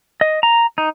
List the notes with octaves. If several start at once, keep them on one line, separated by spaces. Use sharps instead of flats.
D#5
A#5
D#4